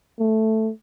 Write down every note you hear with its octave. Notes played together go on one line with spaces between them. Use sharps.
A3